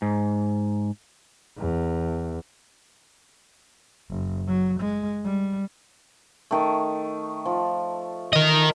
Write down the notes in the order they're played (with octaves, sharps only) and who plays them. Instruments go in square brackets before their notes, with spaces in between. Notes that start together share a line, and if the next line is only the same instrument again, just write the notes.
[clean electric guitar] G#2
[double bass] E2
F#1
F#3
G#3
G3
[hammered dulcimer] D#3 A3
F3
[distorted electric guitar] A#4 D#5